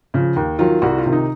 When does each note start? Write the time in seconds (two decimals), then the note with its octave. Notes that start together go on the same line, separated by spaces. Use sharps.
0.14 C#3 F3
0.36 D#2
0.59 D#3 F#3 F4
0.82 C2 F#4
0.98 F4
1.05 C3 D#3
1.12 D#4